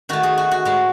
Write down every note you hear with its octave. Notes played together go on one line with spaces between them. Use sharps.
D#3 A3 F#4
G#4
F#4
F#4
A2 G#3 F#4